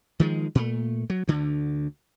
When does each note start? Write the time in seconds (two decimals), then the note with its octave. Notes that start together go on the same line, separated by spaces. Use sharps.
0.20 D#3 F3 G#3
0.55 A#2 A3
1.10 F#3
1.28 D2 D3